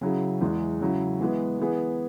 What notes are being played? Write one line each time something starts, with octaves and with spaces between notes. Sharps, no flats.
C#3 F#3 E4 G#4
E2 E3 G#3
C#3 F#3 E4
E3 G#3 B3
E3 B3 G#4